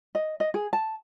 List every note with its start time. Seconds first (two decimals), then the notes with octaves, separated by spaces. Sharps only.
0.15 D#5
0.40 D#5
0.54 G#4
0.73 A5